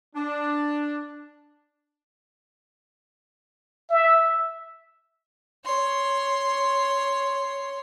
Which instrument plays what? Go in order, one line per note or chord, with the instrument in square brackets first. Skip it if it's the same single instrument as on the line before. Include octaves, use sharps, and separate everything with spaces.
[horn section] D4
[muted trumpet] E5
[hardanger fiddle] C#5 C6